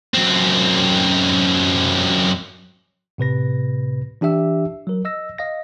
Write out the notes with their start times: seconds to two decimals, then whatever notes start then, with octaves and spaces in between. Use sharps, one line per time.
0.14 F#2 C4
3.18 A2 C3 B4 A#6
4.21 E3 D4 G4 E5 E6
4.87 F#3 A#4
5.05 D#5 E6 A#6
5.38 D#5 F5 A#6